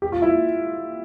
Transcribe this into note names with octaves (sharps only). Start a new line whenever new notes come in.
G4
F4
E4